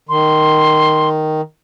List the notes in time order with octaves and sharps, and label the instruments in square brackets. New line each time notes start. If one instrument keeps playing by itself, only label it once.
[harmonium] D#3 [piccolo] C6